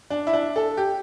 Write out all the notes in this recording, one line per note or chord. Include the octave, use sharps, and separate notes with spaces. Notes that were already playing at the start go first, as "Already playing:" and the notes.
D4
E4
D4
A4
G4